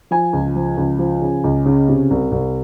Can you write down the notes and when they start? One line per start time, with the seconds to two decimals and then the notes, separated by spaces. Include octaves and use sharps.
0.11 F3 G#5
0.33 C#2
0.56 F3
0.77 C#2
0.99 F3
1.21 C#3
1.44 C#2
1.65 C#3
1.88 C3
2.10 C2
2.32 C2